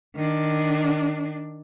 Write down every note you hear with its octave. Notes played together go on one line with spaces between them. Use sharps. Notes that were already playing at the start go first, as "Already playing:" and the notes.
D#3 D4